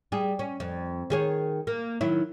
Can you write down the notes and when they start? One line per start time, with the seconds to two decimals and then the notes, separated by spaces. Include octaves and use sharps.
0.12 G3 G#4
0.39 C#4
0.60 F2
1.10 D#3 G#4 C#5
1.67 A#3
2.01 D#3 F#3 E4